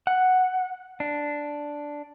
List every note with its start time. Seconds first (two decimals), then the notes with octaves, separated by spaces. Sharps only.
0.07 F#5
1.00 D4